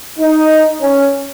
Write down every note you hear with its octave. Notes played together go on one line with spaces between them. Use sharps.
D#4
C#4